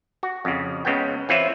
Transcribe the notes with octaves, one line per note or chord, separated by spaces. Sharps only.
F#4
F2 C#3
C#2 C#3 B3 G5
E3 C4 F4 B4 C#5 E5